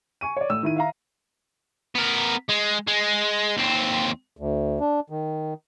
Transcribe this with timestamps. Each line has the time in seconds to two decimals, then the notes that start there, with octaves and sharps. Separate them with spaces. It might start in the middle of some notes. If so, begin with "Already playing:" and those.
0.21 G#5 C#6 D#7
0.37 C#5 D5
0.50 A2 E6
0.63 D#3 E4 D#7
0.76 E5 F5 A#5
1.95 B3 A#4
2.49 G#3
2.88 G#3
3.57 D#2 C4
4.37 D2
4.80 D4
5.10 D#3